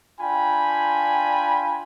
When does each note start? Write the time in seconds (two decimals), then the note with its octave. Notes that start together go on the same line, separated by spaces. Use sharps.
0.20 D4 F4 G5 G#5 B5